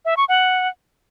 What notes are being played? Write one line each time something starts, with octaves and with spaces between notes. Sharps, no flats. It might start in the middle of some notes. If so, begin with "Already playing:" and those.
E5
C#6
F#5